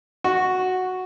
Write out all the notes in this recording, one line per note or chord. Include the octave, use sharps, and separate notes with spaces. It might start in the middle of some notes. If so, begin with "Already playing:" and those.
F#4